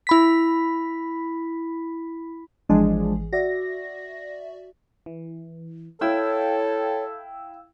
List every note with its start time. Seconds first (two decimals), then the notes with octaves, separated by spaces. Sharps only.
0.07 E4 B5 B6
2.69 G#1 E3 F3 G#3 D4 G#4
3.33 F#4 D5 E5 A#6
5.06 E3
6.01 E4 A4 C#5 F5 G5 E6